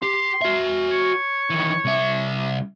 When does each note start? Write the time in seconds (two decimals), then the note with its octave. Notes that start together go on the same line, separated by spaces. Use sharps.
0.03 G4 C6
0.41 F#4 E5
0.91 C#5
1.50 D#3 E3
1.85 C2 E5